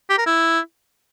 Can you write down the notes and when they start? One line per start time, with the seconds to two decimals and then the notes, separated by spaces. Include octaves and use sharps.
0.10 G4
0.18 A#4
0.26 E4